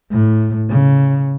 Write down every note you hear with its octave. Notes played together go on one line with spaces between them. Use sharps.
A2
C#3